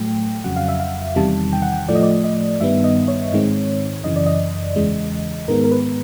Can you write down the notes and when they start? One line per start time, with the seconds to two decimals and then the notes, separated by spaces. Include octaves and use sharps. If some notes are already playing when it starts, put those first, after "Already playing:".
Already playing: A2 F#3 A3 G5
0.44 F2 C#3 F#3 F#5
0.56 F5
0.68 E5
0.80 F5
1.16 E2 C3 D#3 G3 A5
1.53 G5
1.62 F#5
1.73 G5
1.89 A2 F3 A3 D5
1.95 D#5
2.03 D5
2.24 D#5
2.60 G2 D#3 G3 B3 E5
2.84 D#5
3.08 C#5
3.32 G#2 D#3 G#3 C4
4.04 F#2 C#3 E3 D#5
4.16 D5
4.27 D#5
4.76 E2 C#3 E3 G#3
5.48 G#2 D#3 G#3 B3 A#4
5.64 A#4
5.71 B4